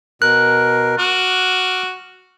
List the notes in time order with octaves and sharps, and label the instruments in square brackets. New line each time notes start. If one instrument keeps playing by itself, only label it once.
[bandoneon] B2 A#4 [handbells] F#6
[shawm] F#4 [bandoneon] D6 F6